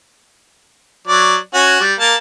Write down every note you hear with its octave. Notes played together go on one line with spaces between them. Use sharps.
F#3 D5
C#4 F#4
G3
A#3 A#4 A5